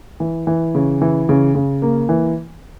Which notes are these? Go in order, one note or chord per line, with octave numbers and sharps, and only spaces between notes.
E3
E3
C#3
E3
C#3
C#3
A#3
E3